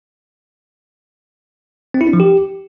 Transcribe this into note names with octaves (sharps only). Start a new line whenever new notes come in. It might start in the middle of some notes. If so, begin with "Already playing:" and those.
C4
E4
D4
F3
G4